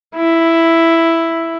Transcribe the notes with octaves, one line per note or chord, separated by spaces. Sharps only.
E4